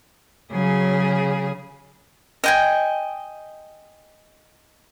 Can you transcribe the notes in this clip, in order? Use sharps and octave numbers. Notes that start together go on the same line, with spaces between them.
C#3 F#3 G#4
D#5 G5 G#5